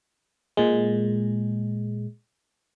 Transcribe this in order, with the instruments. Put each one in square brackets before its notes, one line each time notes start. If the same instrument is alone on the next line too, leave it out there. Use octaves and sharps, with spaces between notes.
[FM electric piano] A#2 G#3